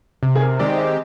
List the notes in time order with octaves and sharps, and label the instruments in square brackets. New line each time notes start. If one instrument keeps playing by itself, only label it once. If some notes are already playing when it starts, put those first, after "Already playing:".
[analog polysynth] C3
[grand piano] G#4
A#4
[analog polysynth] D#3 G#3 C4 G4 [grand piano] D5
[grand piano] D#5